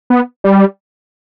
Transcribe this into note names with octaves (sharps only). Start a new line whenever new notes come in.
B3
G3